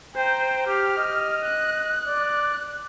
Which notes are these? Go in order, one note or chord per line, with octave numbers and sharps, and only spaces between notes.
C5 G5 A#5
G4 F6
D#5
F#6
D5